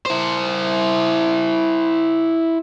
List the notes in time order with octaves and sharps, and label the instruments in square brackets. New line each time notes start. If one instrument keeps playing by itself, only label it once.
[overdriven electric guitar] E4 C5